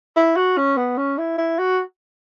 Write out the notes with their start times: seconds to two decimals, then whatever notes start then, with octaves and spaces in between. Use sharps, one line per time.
0.16 E4
0.36 F#4
0.58 C#4
0.77 B3
0.98 C#4
1.18 E4
1.38 E4
1.59 F#4